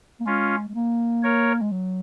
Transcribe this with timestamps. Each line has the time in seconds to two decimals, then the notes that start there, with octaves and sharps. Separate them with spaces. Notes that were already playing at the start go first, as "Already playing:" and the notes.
0.20 A#3
0.26 G#3 C#4 F4
0.69 G#3
0.75 A#3
1.23 A#4 C#5
1.61 G#3
1.72 F#3